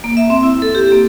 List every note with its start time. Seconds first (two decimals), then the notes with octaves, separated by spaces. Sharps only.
0.04 A#3
0.17 E5
0.30 C4
0.43 E4
0.62 A4
0.75 G4
0.92 A#3